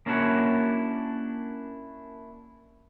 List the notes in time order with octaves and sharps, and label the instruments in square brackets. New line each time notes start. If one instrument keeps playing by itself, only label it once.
[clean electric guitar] A#3 C#4 D4 E4 F#4 C#5